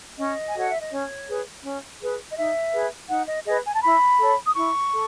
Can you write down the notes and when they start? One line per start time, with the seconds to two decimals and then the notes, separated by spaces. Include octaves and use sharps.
0.18 C#4 D#5
0.49 G#5
0.55 F#4 A4 C#5 F#5
0.70 E5
0.81 D#5
0.91 C#4 C#5
1.28 G#4 B4
1.63 C#4
2.01 G#4 B4
2.30 D#5
2.36 D#4 E5
2.73 G#4 B4
3.09 D#4 F#5
3.27 D#5
3.45 G#4 B4 D#5
3.66 G#5
3.74 A5
3.82 E4 B5
4.18 A4 C#5
4.47 D#6
4.55 E4 C#6
4.91 A4